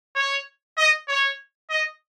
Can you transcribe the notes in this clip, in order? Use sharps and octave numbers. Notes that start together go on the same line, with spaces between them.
C#5
D#5
C#5
D#5